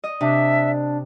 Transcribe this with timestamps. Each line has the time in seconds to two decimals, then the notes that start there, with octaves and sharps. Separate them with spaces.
0.04 D#5
0.21 C3 D4 E5